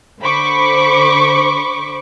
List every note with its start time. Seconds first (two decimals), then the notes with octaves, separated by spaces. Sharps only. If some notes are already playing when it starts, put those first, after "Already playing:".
0.21 D3 C5 B5 C#6 D6